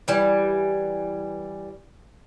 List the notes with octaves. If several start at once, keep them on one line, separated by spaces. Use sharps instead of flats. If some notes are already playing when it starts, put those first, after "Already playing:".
E3 G3